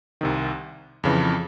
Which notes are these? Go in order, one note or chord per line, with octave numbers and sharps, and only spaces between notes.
C2 C3 D#3
F2 C#3 E3